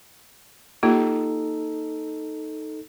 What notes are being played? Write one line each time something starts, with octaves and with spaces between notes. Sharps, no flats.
A#3 D#4 F4 G4 A4